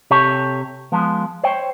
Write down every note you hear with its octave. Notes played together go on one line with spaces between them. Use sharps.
C3 G4 A4 C#5
F3 G#3 B3
C5 C#5 G5